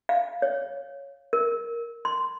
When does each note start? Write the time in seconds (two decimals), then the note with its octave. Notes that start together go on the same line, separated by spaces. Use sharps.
0.09 F5
0.42 C#5
1.33 A#4
2.05 C6